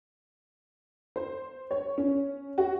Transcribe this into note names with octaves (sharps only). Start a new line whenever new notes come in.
C5
C#5
C#4
F#4